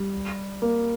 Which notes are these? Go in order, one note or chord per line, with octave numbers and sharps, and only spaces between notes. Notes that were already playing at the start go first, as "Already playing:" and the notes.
Already playing: G3
A#3